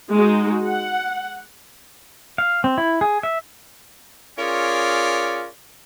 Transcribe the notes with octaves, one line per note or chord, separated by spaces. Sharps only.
G#3 D#4 F#4
F#5
F5
C4
E4
G#4
E5
C#4 F4 G#4 A#4 C#5 D5